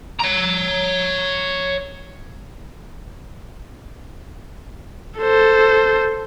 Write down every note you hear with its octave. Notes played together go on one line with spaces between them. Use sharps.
C#5 A#5
A4 C5